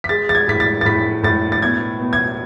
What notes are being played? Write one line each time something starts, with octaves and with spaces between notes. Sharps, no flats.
B6
G#3 A6
A6
G#6
A2 B6
A6
A6
A2 B6
A2 A6
A6
B2 G#6
B2
G#6